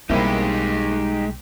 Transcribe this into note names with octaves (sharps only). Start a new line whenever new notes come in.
B1 G3 G#3 A#3 C4 D#4 E4 G4